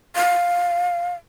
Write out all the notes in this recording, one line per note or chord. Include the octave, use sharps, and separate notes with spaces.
F5